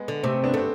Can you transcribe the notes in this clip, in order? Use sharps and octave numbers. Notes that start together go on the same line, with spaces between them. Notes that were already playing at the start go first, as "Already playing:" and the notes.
Already playing: G#3 B3
D3
C3 A3 C4
B3 D4
A3 C4